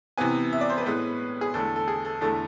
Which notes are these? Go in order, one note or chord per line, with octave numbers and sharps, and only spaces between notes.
C3 E3 B3 G#5
E5
D5
C5
B4
A2 G#3 B3
G#4
E2 D3 A3 A4
A4
G#4
A4
E2 D3 A3 A4